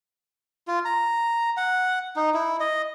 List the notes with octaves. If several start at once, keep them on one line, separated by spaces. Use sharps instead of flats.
F4
A#5
F#5
D#4
E4
D#5